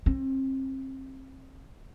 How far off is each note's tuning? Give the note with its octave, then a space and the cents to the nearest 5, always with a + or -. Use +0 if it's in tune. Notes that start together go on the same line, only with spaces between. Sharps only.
C4 +30